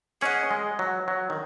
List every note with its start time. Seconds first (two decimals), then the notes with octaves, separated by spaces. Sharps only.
0.21 C#4 G#4 D#5 F#5
0.51 G#3
0.79 F#3
1.08 F#3
1.30 D#3